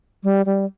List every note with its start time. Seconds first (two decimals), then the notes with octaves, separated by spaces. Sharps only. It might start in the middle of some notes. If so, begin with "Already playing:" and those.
0.23 G3
0.46 G3